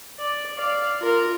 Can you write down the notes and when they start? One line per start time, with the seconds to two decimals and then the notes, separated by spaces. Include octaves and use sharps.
0.19 D5
0.56 D5 F5
0.99 F4 A#4